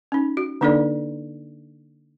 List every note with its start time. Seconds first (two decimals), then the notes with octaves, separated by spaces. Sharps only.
0.12 C#4 D#4
0.37 F#4
0.61 D3 A#3 D4 D#4 A4 D5